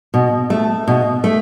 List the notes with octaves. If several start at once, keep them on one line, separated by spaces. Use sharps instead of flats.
B2
A3
B2
A3